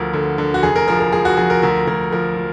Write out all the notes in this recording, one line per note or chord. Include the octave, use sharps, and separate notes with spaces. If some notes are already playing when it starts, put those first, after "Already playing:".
Already playing: D2 F3 A#4
D3
D3
F#4
F1 G#4
A#4
F3 A#4
A#4
F3 G#4
F#4
F3 G#4
A#4
D2 A#4
D2 A#4
F3 A#4
F3